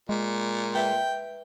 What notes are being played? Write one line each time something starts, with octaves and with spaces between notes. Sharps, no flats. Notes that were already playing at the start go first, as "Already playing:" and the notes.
A#2 G#3
B4 E5 G5